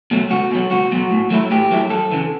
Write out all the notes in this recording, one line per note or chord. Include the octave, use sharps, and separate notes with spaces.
B2 F#3 A3
C#2 F#4
B2 F#3
C#2 F#4
B2 F#3
A2
F#3 A3 E4
A2 G4
F#3 A3 E4
F#2 A4
C#3 E3